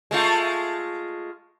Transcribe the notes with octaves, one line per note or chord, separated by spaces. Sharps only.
G#3 A3 F4